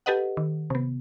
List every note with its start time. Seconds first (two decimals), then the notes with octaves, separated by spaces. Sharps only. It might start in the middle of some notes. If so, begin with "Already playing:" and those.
0.06 G4 A4 B4 D#5 F#5
0.37 D#3
0.70 C3 B3